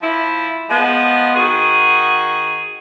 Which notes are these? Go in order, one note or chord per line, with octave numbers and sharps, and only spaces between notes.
F3 E4
F3 G#3 B3
D#3 F#4 G#4